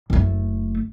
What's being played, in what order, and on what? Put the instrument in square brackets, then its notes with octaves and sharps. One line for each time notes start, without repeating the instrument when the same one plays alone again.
[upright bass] F#1 A3